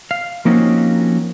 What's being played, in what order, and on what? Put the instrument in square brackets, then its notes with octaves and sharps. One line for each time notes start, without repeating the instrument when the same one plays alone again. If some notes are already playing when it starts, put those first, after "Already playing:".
[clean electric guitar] F5
F3 A#3 C4 C#4 D#4 F#4